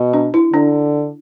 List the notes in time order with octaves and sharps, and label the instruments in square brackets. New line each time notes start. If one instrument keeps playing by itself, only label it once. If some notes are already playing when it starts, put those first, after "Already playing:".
Already playing: [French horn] B2
[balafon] D4
E4
[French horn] D3 [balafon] D4